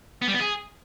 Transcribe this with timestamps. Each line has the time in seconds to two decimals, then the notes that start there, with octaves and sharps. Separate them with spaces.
0.22 B3
0.28 G3
0.34 B3
0.40 G#4